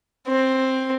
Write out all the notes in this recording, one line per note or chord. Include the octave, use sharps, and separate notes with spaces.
C4